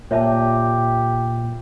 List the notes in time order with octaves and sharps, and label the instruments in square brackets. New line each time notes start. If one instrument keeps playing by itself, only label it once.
[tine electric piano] A#2 [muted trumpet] G4 [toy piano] C#5 E5 A5